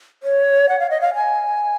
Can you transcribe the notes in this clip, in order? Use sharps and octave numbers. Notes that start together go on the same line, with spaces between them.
C#5
F#5
F5
D#5
F5
G#5